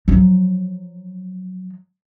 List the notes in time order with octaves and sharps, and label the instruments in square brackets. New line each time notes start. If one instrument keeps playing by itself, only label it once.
[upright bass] F3 F#3